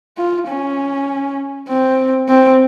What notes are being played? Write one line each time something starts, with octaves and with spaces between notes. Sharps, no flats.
F4
C#4
C4
C4